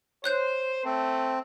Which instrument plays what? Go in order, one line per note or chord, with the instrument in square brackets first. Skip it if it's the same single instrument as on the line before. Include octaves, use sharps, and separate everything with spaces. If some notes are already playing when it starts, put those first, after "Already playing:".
[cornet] C5 [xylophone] C#5 F#6 G6
[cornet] A3 [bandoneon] C4